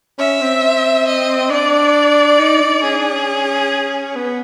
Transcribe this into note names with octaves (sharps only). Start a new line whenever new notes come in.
C#4 E5
C4
D#5
D4 D5
D#4
D#4
C#4 G#4
D4
C#4
B3